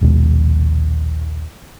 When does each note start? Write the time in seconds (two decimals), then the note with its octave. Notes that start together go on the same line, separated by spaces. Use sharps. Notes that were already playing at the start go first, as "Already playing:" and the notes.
0.01 A#1 D#2 B2 G#3